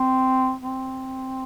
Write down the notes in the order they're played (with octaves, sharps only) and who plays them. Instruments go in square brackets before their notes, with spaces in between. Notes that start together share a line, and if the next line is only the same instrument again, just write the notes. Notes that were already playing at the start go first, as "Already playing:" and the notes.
Already playing: [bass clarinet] C4
C4